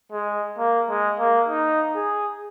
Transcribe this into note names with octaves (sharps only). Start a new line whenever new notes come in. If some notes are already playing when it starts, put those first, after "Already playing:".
G#3
A#3
G#3
A#3
D#4
G#4